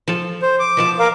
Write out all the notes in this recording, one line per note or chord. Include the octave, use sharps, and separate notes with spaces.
F3 A4
C5
D6
B2 F3 A5
A#4 F5 D6